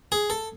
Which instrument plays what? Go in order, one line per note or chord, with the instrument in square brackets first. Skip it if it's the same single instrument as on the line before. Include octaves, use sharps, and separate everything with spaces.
[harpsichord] G#4
A4